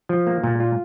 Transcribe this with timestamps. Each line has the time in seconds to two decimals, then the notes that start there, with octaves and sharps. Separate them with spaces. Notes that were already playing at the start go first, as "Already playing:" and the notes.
0.09 F3
0.27 A#3
0.43 A#2
0.60 F4